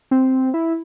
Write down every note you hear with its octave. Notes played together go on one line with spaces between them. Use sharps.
C4
E4